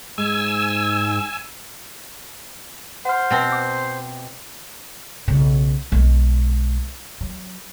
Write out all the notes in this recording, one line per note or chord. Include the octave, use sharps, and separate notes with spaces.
G#2 G#5 E6
C5 F#5 F6
B2 C4
D6
B1 C#3
B1 G#3
F#3